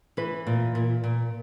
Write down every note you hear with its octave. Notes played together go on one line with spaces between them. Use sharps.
E3 B4
A#2
A#2
A#2